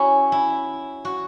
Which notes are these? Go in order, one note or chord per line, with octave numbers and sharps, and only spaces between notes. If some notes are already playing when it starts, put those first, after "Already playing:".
Already playing: C#4 E4 F#4
E4
F#4